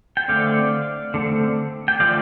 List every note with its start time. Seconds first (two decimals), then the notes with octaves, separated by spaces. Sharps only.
0.17 G5
0.28 D3 A3 C4 D5 F5
1.14 D3 A3 C4
1.88 G5
1.99 D3 F3 A3 D5 F5